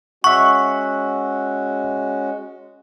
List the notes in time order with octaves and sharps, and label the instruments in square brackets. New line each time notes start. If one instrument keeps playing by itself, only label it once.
[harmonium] G#3 C#4 F#4 [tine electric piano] E5 F#5 [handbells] C#6